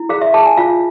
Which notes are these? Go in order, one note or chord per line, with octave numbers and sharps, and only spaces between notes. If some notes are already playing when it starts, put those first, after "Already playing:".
Already playing: E4
G#4 F5
E5
G#4 A5
G#5
F4 F5